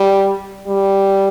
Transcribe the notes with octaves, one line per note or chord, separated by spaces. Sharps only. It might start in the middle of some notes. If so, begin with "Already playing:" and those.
Already playing: G3
G3